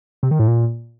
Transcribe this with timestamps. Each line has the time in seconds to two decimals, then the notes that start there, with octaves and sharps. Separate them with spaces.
0.23 C3
0.31 D#3
0.39 A2
0.48 A#2